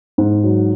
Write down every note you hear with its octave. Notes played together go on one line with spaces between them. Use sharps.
G#2
F#3